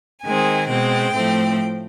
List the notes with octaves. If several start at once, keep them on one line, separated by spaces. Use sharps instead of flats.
D#3 G#3 C4 G#5
B2 G#3 C4 G5
A2 F3 A3 C4